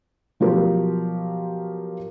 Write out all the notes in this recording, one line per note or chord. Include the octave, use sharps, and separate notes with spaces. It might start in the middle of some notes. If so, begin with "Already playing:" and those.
B2 F3 F#3 F4 G4 A#4